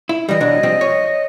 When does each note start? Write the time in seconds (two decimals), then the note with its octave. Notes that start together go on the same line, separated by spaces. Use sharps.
0.09 E4
0.29 E3 G3 D#5
0.41 B1 F#3 D4
0.63 F3 G3 C4
0.81 C#5